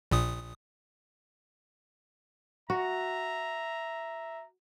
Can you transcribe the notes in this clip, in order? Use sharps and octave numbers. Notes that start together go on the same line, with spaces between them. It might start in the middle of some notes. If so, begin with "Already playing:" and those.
A#1 A#2 D#6
F#4 E5 A#5